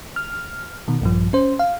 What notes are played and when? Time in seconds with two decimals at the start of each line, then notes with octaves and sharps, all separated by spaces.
0.16 F6
0.88 B2 D#3
1.01 A#1 G2 F3
1.33 C#4 C5
1.59 F5